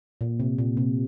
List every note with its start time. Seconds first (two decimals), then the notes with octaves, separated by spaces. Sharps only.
0.21 A#2
0.40 C3
0.58 A#2
0.77 C3